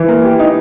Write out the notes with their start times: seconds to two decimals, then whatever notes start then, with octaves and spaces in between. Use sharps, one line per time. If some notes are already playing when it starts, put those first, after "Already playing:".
Already playing: E3
0.08 A#3
0.24 G4
0.39 D#4